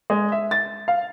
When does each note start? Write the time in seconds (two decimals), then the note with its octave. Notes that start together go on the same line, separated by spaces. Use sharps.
0.10 G#3
0.32 E5
0.51 A6
0.88 F5